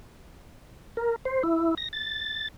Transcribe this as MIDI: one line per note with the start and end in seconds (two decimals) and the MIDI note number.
0.97 1.16 70
1.25 1.43 72
1.43 1.75 64
1.77 1.88 94
1.93 2.48 93